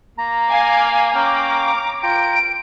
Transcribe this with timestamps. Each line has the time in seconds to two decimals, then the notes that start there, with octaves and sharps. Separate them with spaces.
0.18 A#3 A#5
0.48 F5 G#5 D6
1.15 C#4 F5 G5 A#5 D6
2.03 F4 G5 A#5 D7